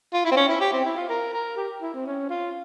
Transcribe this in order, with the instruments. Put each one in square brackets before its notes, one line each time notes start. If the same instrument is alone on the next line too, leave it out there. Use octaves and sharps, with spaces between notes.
[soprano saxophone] F4
E4
C4
C#4
E4
G4
C4
E4
F4
A#4
A#4
G4
E4
C4
C#4
F4